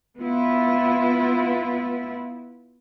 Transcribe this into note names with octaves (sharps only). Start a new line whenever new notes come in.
B3 E4 F4